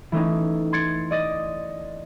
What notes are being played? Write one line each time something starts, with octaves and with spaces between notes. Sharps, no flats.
E3 A3 C#4 D#4
C6 G#6 A6 C#7 D7
D5 D#5 A6